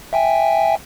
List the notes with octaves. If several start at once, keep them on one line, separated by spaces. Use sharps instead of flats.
E5 G5 G#5